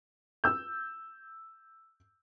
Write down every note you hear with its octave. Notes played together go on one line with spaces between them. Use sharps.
E6 G6